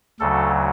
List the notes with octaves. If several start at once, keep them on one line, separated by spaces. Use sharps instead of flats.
D2 C#3 F#3 A4